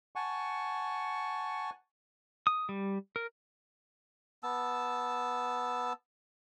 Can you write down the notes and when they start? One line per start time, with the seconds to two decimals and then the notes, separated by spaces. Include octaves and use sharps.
0.16 F#5 G#5 A5 C#6
2.47 D#6
2.69 G3
3.16 A#4
4.43 B3 A5 E6